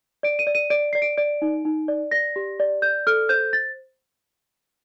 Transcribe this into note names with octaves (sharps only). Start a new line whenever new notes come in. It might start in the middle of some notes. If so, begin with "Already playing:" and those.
D5 D7
D#7
D5
D#7
D5 D7
D5 C7
D7
D5 D7
D#4
D#4
D5
D5 A#6
G4
D5
D5 G6
A4 F6
C5 G6
A6